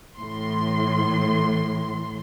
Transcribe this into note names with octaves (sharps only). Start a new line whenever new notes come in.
A2 E3 C6